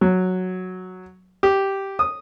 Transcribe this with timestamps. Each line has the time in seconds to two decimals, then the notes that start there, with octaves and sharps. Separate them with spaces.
0.01 F#3
1.43 G4
1.99 D#6